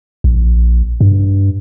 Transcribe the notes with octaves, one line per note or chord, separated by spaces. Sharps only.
A#1
G2